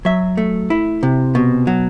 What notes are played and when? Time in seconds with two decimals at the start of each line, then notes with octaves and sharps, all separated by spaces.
0.05 F#3 E5
0.37 A3
0.70 E4
1.03 C3
1.35 B2
1.67 F#3